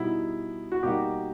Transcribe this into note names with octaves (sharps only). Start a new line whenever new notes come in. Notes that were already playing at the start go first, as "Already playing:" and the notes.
Already playing: B2 G3 B3 D#4 E4
F#4
B2 G3 A#3 D#4 F#4 G4